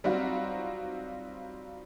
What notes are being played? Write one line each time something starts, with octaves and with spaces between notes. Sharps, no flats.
F#3 G3 C4 D#4 F4 F#4